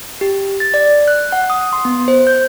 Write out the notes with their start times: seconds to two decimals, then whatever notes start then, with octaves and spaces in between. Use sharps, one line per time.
0.21 G4
0.60 A6
0.74 D5
1.08 F#6
1.32 F#5
1.50 D#6
1.73 C6
1.85 B3
2.08 C5
2.27 G6